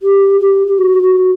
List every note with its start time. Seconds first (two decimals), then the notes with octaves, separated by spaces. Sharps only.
0.02 G4
0.40 G4
0.67 G4
0.78 F#4
1.03 F#4